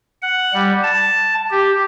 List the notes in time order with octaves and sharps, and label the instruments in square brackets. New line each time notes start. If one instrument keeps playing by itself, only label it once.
[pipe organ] F#5
G3
A5
G4